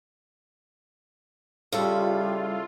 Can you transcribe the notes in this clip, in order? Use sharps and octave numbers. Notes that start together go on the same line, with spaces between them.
C#3 G3 E4 F4 A4